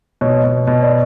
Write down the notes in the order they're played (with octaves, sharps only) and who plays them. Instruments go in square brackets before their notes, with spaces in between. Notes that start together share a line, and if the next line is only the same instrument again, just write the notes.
[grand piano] B2 [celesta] C#5
[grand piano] B2
B2
[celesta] D5